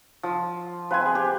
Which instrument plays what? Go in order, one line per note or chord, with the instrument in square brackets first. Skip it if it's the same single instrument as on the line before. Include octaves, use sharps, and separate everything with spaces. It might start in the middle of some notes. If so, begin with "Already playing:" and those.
[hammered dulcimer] F3
[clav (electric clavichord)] C4 F4 [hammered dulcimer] B4 G#5
[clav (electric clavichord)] C4 G#4
[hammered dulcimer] G4